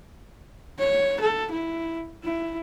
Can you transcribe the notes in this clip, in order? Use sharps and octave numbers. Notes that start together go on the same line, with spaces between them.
C#5
A4
E4
E4